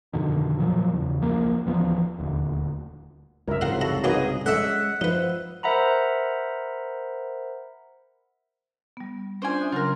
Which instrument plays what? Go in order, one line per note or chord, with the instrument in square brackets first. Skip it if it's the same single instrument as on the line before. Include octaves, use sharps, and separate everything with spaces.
[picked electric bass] F2 B2 D3 D#3
A#2 F3 F#3
E2 C#3
C#2 F3 A#3
D1 E3 F3 B3
D#1 D2
[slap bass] C#2 F#2 [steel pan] A#4 E5
[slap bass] C2 G#2 C#3 [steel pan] F4 [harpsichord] A#4 F5 F#5
[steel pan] F#4 A4 [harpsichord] E5 A#5 B5
[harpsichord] F#3 A#3 F4 [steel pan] D#4 B4 D#5 [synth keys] G#4
[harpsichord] D3 A3 [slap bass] G#3 [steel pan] C#4 [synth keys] E5 F#5
[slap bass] F3 [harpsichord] D#4 B4
[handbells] A#4 C5 E5 F#5 A#5 B5
[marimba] G3 B3
[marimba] C#4 D4 F4 [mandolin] C5 D5 G#5
[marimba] E5 D#6 F#6
[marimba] C#3 F#3 G#5 [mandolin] F4 A#4